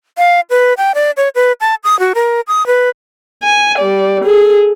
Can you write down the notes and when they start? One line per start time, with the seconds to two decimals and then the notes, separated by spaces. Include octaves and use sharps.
0.18 F5
0.50 B4
0.78 G5
0.95 D5
1.17 C#5
1.35 B4
1.61 A5
1.84 D#6
2.00 F#4
2.15 A#4
2.48 D#6
2.67 B4
3.43 G#5
3.78 G3 D5
4.24 G#4 A4